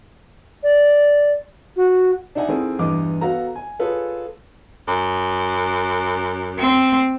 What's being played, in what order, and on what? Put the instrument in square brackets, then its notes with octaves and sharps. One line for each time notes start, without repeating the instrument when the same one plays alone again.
[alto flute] D5
F#4
[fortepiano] D4 D#4 E5 F#5 G#5
D#3 C4 E4 G#4 A4
E2 G2 D#5 D6
B3 F#4 A4 F5 F#5 A#5
G#5
F4 G#4 A4 B4 C#5
[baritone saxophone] F#2
[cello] C4